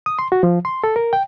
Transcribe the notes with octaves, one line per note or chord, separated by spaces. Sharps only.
D#6
C6
F#4
F3
C6
A4
A#4
G5